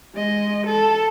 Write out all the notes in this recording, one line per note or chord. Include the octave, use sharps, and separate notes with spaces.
G#3 D#5
A4